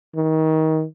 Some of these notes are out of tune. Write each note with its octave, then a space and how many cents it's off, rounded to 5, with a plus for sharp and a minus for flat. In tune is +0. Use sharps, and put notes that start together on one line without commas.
D#3 +25